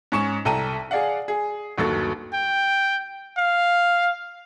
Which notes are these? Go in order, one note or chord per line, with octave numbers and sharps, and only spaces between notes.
G#2 C#4 C#6 E7
C2 A4 G5 A5 A#5 D#7
G#4 D5 F5 F#5
G#4
G1 D#2 F#3 A4 C#6 A6
G5
F5